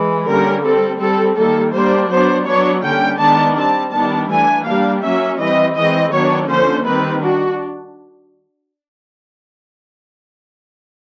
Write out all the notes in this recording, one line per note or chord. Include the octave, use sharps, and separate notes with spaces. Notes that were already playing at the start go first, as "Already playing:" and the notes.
Already playing: E3 G#3
D3 G3 A#3 C#4 A#4
G3 C4 A4
G3 C4 A4
D#3 G3 A#3 A4
G3 A#3 D4 C5
F#3 B3 D4 C5
F#3 B3 D4 C#5
D3 G3 A#3 C#4 G5
D#3 G#3 B3 D4 A5
G3 C4 A5
D#3 G3 B3 D4 A5
E3 A3 D4 G#5
G3 A#3 D4 F5
F#3 A#3 C#4 E5
E3 G3 C4 D#5
E3 G#3 C4 D#5
D#3 F#3 B3 D4 C#5
D3 F3 A#3 C#4 C5
D#3 G3 C4 B4
D4 F#4